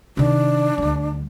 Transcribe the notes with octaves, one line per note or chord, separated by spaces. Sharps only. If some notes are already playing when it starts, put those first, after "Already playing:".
C3 D#3 D4
D2 G3